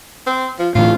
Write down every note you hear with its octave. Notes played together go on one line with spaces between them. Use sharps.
C4
F3
A2 D3 E3 F4